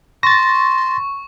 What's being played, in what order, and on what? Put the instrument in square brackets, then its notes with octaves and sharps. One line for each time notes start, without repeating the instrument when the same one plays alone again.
[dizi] C6 [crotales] C#6 [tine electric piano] A6 A#6